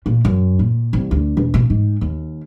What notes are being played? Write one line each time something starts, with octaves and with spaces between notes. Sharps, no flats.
A#2
F#2
A#2
C2
D2
E1
B2
G#2
D#2